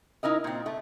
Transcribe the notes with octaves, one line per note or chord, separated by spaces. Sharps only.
D#4 E4 A#4 D#5
A#2 C4
A3